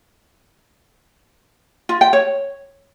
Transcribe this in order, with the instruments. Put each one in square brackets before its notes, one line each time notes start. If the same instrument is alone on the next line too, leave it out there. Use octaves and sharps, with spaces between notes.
[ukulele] F4
G5
C#5